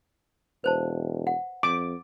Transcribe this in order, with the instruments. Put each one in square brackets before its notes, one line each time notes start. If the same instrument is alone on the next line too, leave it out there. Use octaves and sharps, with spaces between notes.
[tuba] E1 [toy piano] B4 C5 A5
[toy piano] F#5
[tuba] F2 [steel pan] D6